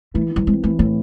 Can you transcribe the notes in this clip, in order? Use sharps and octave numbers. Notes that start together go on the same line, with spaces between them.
E3 A3
E3
F#3
G#3 C4
E3 A3
A2 C4